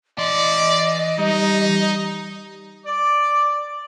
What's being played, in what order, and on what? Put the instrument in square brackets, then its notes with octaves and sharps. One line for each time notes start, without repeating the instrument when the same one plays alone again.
[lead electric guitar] E3 C6 [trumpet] D5 [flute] D#5
[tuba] G3 [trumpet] D#4
[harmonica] D5 D6